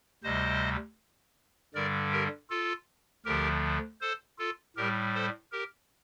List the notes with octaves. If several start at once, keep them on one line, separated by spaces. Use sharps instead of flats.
D2 C3 G3 C5 D#5
G2 D3 G3 A#4 D5
G4 A#4
F4 A4
D2 D3 F3 G4 A#4
A4 C5
F4 A4
A2 G3 G4 A#4
A4 C5
G4 A#4